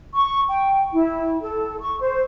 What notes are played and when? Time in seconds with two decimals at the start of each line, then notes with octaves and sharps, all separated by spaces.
0.14 C#6
0.49 G5
0.93 E4
1.41 A4
1.80 C#6
2.00 C5